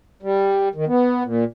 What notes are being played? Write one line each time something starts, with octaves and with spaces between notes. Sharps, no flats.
G3
D#3
B3
A#2